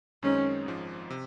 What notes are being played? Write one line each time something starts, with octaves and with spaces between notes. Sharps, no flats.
F#2 D#3 G#3 C4 C#4 D#4
G#1 G#2 F3
C3